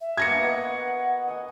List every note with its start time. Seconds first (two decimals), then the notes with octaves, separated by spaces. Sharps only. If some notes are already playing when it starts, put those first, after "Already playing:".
0.01 E5
0.17 A#3 B3 F#4 G#6 A#6 C#7
0.42 B4 D#5 F#5 B5
1.28 D#5 F#5 G#5